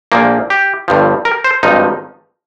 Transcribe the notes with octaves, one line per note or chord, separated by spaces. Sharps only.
A#1 A#2 F3 A#3
G4
G1 G2 F3
A#4
C5
G#1 G2 F3 D#4